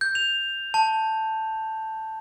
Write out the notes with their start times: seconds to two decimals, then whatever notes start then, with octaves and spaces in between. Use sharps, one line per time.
0.01 G6
0.15 F7
0.74 A5